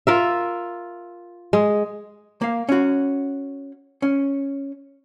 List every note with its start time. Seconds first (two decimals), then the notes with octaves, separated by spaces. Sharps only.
0.07 F4 A#4 E5
1.53 G#3
2.41 A#3 F5
2.69 C#4 F#4
4.02 C#4